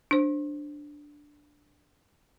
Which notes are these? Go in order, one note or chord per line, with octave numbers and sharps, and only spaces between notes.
D4 C5